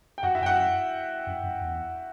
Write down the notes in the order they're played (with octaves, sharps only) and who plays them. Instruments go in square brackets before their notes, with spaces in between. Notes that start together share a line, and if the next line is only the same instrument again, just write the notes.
[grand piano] G5
[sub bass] F#2 [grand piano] F#4 F#5
[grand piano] E4 E5
[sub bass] F#2 [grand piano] G5
[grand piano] F#4 F#5
[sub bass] F#2
F#2
E2